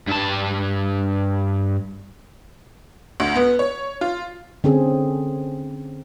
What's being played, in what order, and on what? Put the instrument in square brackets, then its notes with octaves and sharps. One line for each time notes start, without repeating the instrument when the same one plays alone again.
[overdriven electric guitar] G2 A5
[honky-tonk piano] D2
B3
C#5
F4
[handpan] D3 C4 C#4 G#4